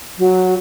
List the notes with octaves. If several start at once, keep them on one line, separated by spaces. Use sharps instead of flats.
F#3